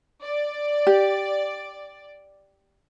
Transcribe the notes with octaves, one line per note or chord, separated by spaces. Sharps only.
D5
G4